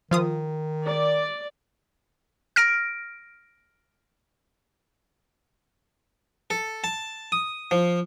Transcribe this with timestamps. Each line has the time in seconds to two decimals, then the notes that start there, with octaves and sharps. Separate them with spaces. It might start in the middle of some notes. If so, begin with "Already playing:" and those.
0.11 D#3 F3 F4 D#6
0.84 D5
2.56 F6 A#6 D7
6.50 A4
6.84 A5
7.32 D#6
7.71 F3